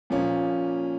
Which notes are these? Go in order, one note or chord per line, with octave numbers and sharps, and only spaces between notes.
A#2 F3 A#3 C#4